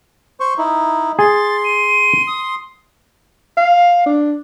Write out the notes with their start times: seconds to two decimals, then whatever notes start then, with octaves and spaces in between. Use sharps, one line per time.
0.40 C5 C#6
0.58 D#4 E4
1.19 G#4 C6 A6
1.64 D#7
2.27 D#6
3.57 F5
4.06 D4